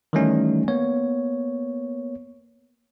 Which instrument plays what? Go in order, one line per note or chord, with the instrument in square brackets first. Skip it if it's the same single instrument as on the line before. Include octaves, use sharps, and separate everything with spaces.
[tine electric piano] D#3 E3 G3 A3 C#4 D#4
A#3 B3 C#5